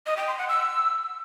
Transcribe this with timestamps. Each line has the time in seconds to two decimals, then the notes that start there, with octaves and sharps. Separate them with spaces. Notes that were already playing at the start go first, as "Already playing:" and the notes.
0.06 D#5
0.17 G5
0.27 C6
0.38 F#5
0.49 E6